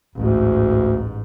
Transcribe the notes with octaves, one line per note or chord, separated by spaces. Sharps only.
A1 D2 G#2